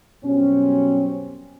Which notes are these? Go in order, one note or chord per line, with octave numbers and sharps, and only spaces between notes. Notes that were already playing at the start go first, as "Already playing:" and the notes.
F#2 B2 G3 C4 C#4